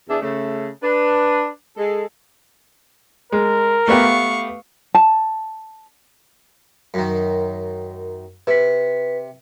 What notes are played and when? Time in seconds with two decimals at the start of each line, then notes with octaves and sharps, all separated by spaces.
0.09 E2 D4 G#4 E5
0.22 C#3 A3
0.83 D4 B4
1.77 G#3 A4
3.32 G#3 A#4
3.88 A3 B3 G4 F5 C#6
4.94 A5
6.94 F#2 D#3
8.47 C3 B4 B6